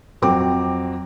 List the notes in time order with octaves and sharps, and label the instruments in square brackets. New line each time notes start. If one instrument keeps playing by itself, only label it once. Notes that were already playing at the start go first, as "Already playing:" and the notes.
[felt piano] F2 F#3 C4 D6